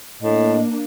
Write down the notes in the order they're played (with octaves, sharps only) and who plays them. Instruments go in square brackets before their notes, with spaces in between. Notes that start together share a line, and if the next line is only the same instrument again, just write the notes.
[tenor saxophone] A2 [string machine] A#3 D4 [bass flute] D#5